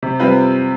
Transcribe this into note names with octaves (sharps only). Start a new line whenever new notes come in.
C3
G3 C4 F4 B4